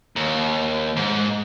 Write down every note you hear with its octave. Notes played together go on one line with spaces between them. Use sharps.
D#2
G#2